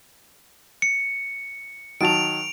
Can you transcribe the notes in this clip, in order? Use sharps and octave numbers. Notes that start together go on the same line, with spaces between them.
C#7
D#3 F#3 A5 D7 F7